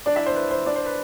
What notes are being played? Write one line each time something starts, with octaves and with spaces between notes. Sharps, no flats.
D4 D5
E4 E5
C5
B4
C5
D4 D5
C5
B4